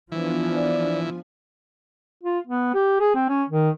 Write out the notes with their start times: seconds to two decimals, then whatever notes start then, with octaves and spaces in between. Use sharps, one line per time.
0.12 E3 F3 B3 D4 G#5
0.54 D5
2.23 F4
2.47 B3
2.74 G4
3.00 G#4
3.15 C4
3.29 C#4
3.49 D#3